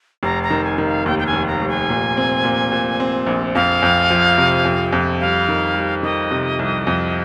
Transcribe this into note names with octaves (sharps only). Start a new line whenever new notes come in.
F1 A#5
A#5
D#3
G#5
D#3
F5
D#2 G5
G5
G#5
F1
A#5
F1
G#5
A#2
C4
A#2
A#2
C4
A#1
F2 F5
F2
F3
C3
F2
F2
G3 F5
D#3
G3
D#3 D#5
C3
C2
F2